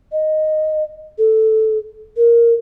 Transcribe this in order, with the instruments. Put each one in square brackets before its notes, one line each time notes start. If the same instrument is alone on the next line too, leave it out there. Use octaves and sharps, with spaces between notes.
[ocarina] D#5
A4
A#4